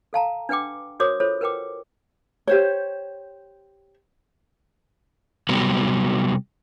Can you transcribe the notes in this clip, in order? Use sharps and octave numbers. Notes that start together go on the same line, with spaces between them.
A4 F5 A5 A#5
D4 B4 F#5 G5 D6
F#4 A#4 C5 C#5 D6 D#6
F4 A4 C5 C#5
A#4 B4 F#5 G5 D6
G4 C5 C#5
C3 F#3 G3 B3